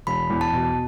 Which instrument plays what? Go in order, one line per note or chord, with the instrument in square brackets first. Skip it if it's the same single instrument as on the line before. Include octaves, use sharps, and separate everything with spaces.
[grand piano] E1 [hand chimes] B5
[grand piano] E2
[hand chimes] A5
[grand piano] B2